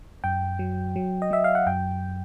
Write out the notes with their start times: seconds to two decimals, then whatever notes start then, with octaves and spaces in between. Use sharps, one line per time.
0.24 F#2 G5
0.59 F#3
0.96 F#3
1.22 D#5
1.31 F#3 E5
1.44 F5
1.55 F#5
1.66 F#2 G5